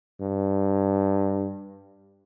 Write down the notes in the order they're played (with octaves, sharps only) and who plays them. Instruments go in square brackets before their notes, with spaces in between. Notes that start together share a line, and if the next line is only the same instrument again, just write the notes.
[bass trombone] G2